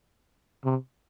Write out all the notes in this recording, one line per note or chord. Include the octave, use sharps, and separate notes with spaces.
C3